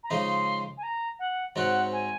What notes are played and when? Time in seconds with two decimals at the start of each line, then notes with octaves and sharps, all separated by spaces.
0.04 A#5
0.10 C#3 F3 G#3 D#4 C6
0.78 G#5
0.83 A#5
1.19 F#5
1.56 G#2 F#3 C4 F#4 F#5
1.93 G#5